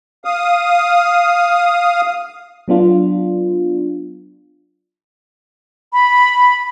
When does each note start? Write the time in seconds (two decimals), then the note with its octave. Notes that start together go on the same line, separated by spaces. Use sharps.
0.25 F5 D#6
2.68 F#3 B3 D4 F4
5.92 B5